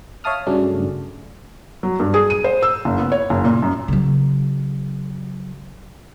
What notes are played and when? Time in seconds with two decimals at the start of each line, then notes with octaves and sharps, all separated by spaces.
0.24 C#5 E5 F5 A5 D#6 F6
0.47 G2 C#3 F#3 A3 C#4 D4
1.83 F#3
2.00 G2
2.14 G#4
2.30 D#7
2.44 C5
2.63 E6
2.85 F#1
2.98 B3
3.12 C#5
3.30 F#1
3.44 A#2
3.62 F#2
3.88 C#3 F#3